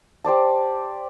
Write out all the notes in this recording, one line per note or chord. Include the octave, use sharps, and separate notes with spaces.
G4 C5 D5 A5